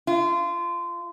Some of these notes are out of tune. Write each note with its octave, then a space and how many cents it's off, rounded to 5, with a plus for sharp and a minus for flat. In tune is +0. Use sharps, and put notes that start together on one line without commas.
F4 -25